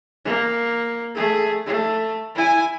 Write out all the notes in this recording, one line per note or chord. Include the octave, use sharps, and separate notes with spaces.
A#3
A3 G#4
A3
E4 G#5